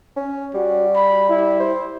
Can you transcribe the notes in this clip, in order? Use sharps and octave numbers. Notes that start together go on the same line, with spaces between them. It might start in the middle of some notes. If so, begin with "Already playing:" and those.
C#4
G3 F#4
B5
E4
C5